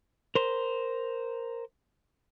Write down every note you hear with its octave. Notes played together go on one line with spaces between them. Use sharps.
A#4 C5